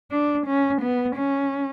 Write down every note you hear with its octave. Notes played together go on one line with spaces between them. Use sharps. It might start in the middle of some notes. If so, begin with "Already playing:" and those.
D4
C#4
B3
C#4